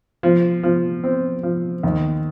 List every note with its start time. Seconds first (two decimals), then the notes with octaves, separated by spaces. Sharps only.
0.23 F3
0.63 F3
1.04 C4
1.43 F3
1.83 D#2